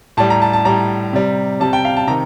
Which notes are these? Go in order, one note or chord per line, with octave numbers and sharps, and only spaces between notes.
A2 G3 A5
A#5
A5
A5
A2 G3 A#5
C3 G3
C3 G3 A5
G5
F5
A5
C3 D#3 A#5